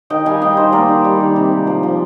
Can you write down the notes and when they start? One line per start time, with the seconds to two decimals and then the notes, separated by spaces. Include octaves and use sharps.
0.10 D#3 D#5 G5
0.25 G3 F5 G#5
0.41 G3 D#5 G5
0.57 D#3 C5 D#5
0.72 A#3 A#4 D5
0.89 D#3
1.05 G3
1.20 D#3
1.36 C3
1.52 G#3
1.67 F3
1.83 F3